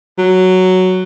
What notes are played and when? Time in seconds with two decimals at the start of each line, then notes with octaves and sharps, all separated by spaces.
0.18 F#3